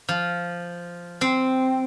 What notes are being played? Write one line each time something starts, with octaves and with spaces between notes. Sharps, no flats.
F3
C4